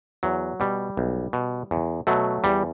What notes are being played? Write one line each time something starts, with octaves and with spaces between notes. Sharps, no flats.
E2 F#3
B2 G3
B1
B2
E2
B2 F#3 A3
E2 G3